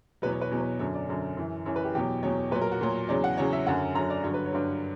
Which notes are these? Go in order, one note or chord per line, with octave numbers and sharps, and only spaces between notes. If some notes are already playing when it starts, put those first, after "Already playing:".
E2 B2 F#3 B4
C#5
B4
E2 B2 F#3 C#5
B4
F#2 D3 F#3 C#5
D5
F#2 D3 F#3
F#2 E3
F#2 E3 C#5
B4
G4
E2 B2 F#3 G4
E2 B2 F#3 C#5
A#2 F#3 B4
A#4
F#4
A#2 F#3
E2 C#3 F#3 D5
F#5
E2 C#3 F#3 C#5
E5
F#2 D3 F#3 F#5
F#2 D3 F#3 A#5
D5
G2 D3 F#3 C#5
B4
C#5
G2 D3 F#3